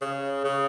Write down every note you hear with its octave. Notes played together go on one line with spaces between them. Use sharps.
C#3
C#3